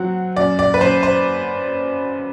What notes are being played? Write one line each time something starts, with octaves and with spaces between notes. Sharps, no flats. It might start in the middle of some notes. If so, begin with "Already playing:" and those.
Already playing: F#3 C4 F#5
F#2 D5
D5
B4
F#2 C5
C5